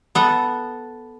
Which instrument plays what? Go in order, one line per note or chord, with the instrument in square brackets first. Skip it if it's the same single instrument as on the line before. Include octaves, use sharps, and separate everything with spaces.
[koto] B3 A4